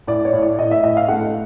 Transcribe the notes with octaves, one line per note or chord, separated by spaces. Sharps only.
A2 D5
C#5
A2
D5
A2 D#5
E5
A2 D#5
F5
A3 F#5